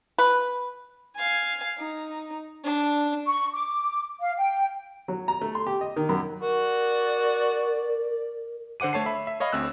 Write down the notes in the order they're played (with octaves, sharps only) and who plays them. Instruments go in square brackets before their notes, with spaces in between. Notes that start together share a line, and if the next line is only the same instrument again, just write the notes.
[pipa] B4
[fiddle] F5 G#5
D#4
D4
[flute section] C#6
D6
F5
G5
[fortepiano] F#3
A#5
A3
C6
G4
D#5
D#3
F#2
[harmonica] F#4 [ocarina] A#4 [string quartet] D5
[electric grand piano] D3 C5 F#5 D6 D#7
A3 C#5 A5 C7
E5 B5
E5
C#5 D#5 F5 B5
D2 C4 E6 F#6